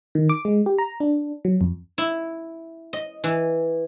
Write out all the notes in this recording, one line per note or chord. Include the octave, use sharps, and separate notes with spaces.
D#3
D6
G#3
G4
A#5
D4
F#3
F2
E4
D#5
E3